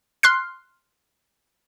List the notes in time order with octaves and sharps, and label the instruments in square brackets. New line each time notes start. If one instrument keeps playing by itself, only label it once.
[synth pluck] C6 F6 F#6 C7